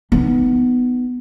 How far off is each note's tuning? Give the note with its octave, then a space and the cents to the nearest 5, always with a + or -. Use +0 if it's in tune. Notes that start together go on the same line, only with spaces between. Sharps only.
B3 +10 D#4 -15